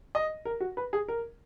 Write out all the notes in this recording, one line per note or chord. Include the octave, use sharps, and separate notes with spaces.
D#5
A#4
F#4
B4
G#4
A#4